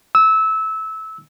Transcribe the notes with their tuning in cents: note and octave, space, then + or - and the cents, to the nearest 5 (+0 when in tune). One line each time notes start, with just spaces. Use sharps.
E6 -20